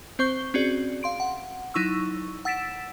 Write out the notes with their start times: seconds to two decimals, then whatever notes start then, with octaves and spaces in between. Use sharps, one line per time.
0.19 C4 C5 C#6 G6 G7
0.54 C4 C#4 F#4 G#4 D5
1.03 F5 C6 D7
1.20 F#5
1.74 F#3 D#4 E4 C#6 E6
2.45 F#5 E6 A6 B6 D7 E7